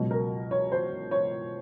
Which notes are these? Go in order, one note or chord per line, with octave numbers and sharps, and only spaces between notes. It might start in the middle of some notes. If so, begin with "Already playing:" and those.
Already playing: C#2 B2 F#3
A#4
C#5
C5
C#5